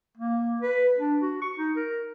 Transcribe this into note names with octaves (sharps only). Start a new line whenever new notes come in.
A#3
B4
D4
F#4
C#6
D#4
A#4